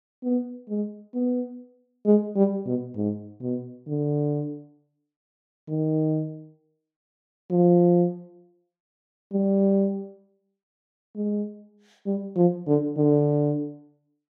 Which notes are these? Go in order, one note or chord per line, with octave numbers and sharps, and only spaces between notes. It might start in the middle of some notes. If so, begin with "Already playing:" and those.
B3
G#3
B3
G#3
G3
B2
G#2
B2
D3
D#3
F3
G3
G#3
G3
F3
D3
D3